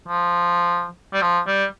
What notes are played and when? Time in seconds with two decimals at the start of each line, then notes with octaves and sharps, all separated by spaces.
0.08 F3
1.13 G3
1.22 F3
1.47 G3